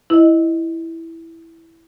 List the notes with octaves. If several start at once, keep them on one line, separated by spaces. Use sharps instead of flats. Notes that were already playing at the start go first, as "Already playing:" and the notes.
E4 D#5